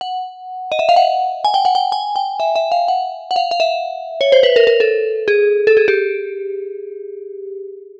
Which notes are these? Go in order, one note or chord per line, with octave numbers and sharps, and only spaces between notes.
F#5
D#5
E5
F5
F#5
G#5
G5
F#5
G5
G#5
G5
E5
E5
F5
F#5
F#5
F5
F5
E5
C#5
C5
B4
A#4
A#4
A4
G#4
A4
G#4
G4